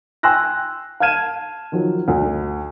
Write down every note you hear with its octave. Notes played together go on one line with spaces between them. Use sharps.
G5 G#5 C6 E6 F#6 A#6
F5 A5 F6 G#6 D#7 E7
D#3 F3 F#3
D2